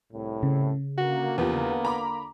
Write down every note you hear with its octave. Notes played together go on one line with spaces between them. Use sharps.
C2 A2
C#3
D3 A#3 F#4
E2 F3 B3 G4
A#5 B5 D6